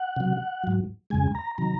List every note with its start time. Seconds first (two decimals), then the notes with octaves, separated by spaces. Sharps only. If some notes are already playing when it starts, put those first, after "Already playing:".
Already playing: F#5
0.16 C3 F#3
0.64 G#2 F#3
1.10 F2 C#3 G#3 G#5
1.35 A#5
1.58 C3 D#3 F#3 A#5